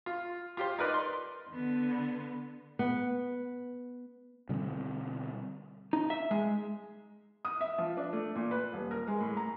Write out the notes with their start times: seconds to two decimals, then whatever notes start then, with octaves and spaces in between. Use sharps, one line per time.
0.06 F4
0.57 F4 G4 C5
0.79 D#4 A#4 B4 D5
0.94 C6
1.50 D3 B3
2.79 B3
4.49 B2 D3 G3 C4
5.93 D#4
6.10 E5
6.31 G#3
7.45 D#6
7.61 E5
7.78 F3
7.97 D4
8.13 A3
8.35 A#2
8.51 B4
8.73 D#1
8.91 A#4
9.08 G#3
9.21 A2
9.37 A#5